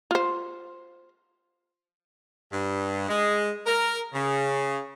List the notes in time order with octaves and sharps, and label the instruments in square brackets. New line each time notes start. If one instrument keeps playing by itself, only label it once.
[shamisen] F4 C5
[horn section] G2
G#3
A#4
C#3